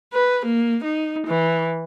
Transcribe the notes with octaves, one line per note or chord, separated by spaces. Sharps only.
B4
A#3
D#4
E3